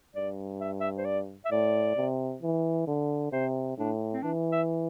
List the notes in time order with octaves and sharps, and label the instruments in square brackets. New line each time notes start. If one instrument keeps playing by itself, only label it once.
[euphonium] G2 [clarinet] D5
[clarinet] E5
E5
C5
D5
E5
[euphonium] A2 [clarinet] D5
[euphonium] C3
E3
D3
[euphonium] C3 [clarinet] C5
[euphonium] A2 [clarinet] D4
[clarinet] C4
[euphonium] E3 [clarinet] D4
[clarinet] E5